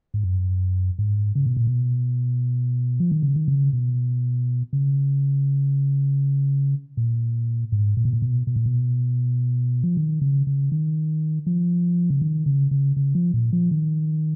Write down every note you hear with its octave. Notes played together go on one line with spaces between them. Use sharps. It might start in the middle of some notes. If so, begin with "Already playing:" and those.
G#2
F#2
G#2
C#3
B2
A#2
B2
F3
D#3
C#3
D#3
C#3
B2
C#3
A#2
G#2
A#2
B2
A#2
B2
B2
A#2
B2
F3
D#3
C#3
C#3
D#3
F3
C#3
D#3
C#3
C#3
C#3
F3
A#2
F3
D#3